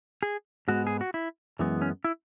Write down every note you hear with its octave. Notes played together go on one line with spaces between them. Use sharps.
G#4
G#2 G#3 B3 F#4
G#4
F#4
E4
F#2 E3 G#3 B3
C#4
E4